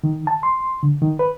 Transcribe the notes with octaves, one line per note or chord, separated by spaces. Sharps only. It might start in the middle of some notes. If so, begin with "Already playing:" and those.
D#3
A5
C6
D3
D#3
B4